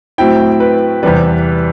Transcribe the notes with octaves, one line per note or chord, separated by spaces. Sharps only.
A2 F#3 C4 E4 G5
B4
E2 C3 E3 G3 B4